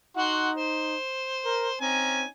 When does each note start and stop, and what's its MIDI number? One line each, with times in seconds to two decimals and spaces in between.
0.17 0.96 63
0.17 0.50 66
0.17 0.50 78
0.17 0.50 84
0.55 1.78 72
1.45 1.69 70
1.81 2.25 60
1.81 2.27 61
1.81 2.27 63
1.81 2.27 80